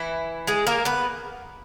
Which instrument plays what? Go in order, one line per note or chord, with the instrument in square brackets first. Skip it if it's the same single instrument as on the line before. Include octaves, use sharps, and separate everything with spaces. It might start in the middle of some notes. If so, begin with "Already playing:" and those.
Already playing: [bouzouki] E3 E4
G#3 G#4
A#3 A#4
B3 B4